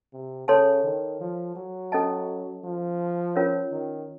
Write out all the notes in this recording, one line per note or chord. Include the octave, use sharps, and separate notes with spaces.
C3
C#3 A4 C#5 A5 C6
D#3
F3
F#3
C#4 A4 D#5 A5
F3
C#4 F4 A#4 C#5
D#3